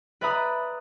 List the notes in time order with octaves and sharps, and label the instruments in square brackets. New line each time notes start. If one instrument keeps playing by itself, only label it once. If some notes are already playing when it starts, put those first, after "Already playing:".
[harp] B4 D5 E5 A#5 B5 D#6